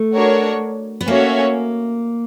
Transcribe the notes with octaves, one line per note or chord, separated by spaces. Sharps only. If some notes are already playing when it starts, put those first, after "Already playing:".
Already playing: A3
D4 F#4 A#4 C#5
B3
A#3 C#4 F#4 A4 C#5 E5